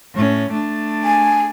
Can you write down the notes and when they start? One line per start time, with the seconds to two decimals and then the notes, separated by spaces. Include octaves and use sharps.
0.14 A2 C#4
0.51 A3 D4
1.04 G#5